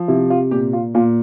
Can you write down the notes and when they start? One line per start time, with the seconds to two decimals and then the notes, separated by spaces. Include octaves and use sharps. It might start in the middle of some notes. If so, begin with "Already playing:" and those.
Already playing: F3
0.08 C3 E4
0.30 F4
0.51 A#2 G4
0.73 F4
0.95 A#2 F4